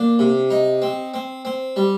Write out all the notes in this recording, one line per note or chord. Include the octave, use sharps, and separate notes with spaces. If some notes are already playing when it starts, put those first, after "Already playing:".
Already playing: A#3 D4
C3
D#4
C4
C4
C4
G3